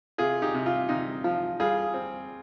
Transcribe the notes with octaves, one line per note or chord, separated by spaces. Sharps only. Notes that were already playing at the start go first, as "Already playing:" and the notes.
C3 F4 G#4
D#4 G4
C3
F4
C3 D#4
F3 F4
G3 F4 G#4
C4